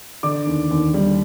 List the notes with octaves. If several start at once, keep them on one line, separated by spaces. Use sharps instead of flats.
D3 D5 D6
D#2
D#2
G3